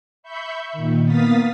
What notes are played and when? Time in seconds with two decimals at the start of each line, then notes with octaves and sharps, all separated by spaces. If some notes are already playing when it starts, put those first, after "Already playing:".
0.23 E5 B5 C#6 G6
0.73 A#2 D#3
1.05 A#3 B3 F5 D#6 A6 B6